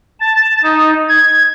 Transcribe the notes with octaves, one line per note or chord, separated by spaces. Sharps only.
A5
D#4
G#6